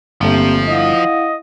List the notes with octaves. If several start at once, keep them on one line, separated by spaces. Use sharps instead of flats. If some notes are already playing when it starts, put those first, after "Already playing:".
G1 F3 A3 A#3 C4 G4
E4 D#5 F5 F#5